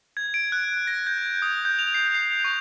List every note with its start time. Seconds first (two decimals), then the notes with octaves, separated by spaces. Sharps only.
0.17 G#6
0.34 D7
0.52 F#6
0.87 A#6
1.07 G6
1.18 G#6
1.42 D#6
1.65 G6
1.79 F7
1.94 C7
2.15 C7
2.44 C#6